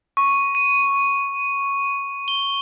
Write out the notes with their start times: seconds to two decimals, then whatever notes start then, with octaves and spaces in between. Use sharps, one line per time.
0.17 C#6
0.55 D#7
2.28 G7